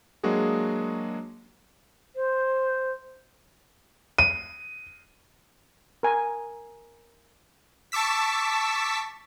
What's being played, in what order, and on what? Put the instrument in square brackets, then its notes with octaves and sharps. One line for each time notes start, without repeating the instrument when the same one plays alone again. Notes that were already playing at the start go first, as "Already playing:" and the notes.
[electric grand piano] F#3 G#3 A#3 D4 F#4 G#4
[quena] C5
[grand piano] D#7
[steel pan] A#4 G#5
[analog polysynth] A5 C#6 D6 E6 B6